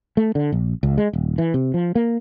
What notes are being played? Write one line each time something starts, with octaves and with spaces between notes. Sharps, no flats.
A3
D3
A#1
C#2
G#3
D#1
E3
C3
F3
A#3